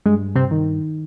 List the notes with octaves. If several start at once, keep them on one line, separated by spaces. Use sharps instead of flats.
G2 G#3
C3 C4
D#3